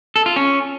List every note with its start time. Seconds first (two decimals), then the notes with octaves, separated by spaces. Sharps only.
0.16 A4
0.26 F4
0.36 C#4